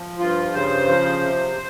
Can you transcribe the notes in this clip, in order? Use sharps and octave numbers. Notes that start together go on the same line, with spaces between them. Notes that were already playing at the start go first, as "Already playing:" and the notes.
Already playing: F3
G2 F4
C#3 C5
F3
C3